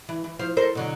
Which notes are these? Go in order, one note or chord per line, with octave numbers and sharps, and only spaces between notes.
E3
E3
F3 C5 F5
A4 A#4 C5
B2 D3 F#3